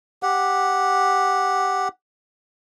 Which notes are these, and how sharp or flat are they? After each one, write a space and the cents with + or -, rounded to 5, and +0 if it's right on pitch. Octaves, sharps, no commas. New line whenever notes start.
G4 +0 F#5 +0